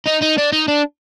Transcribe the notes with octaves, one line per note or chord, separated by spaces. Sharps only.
D#4
D#4
D4
D#4
D4